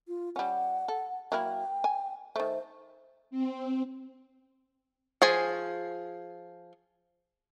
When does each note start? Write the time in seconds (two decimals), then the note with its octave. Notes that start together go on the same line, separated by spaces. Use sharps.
0.08 F4
0.36 G3 C#4 F#5
0.88 A4
1.32 F#3 A#3 E4 G5
1.84 G#5
2.36 D#3 A3 C5
3.31 C4
5.22 F3 G#4 G#5